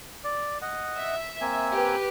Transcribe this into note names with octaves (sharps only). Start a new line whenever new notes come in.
D5
D#5 F#5
E5
A#3 C4 G#5
G4 B4